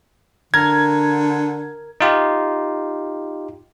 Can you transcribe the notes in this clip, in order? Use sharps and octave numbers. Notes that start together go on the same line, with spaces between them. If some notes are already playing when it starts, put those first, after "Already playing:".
D3 A#4 G#6
D#4 F4 G4